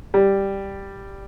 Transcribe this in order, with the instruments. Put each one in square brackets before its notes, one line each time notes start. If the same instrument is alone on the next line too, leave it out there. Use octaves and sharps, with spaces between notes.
[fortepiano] G3